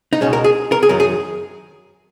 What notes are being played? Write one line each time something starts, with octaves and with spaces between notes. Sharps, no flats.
D#4
C#2 B2 G#3 C#4
A#4
G#4
A#4
G#4
F#2 D#3 F#3 A#4
G#4